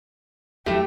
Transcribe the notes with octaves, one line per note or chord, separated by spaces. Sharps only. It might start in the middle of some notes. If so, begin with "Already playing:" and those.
E2 A2 F#3 A3 G4 G5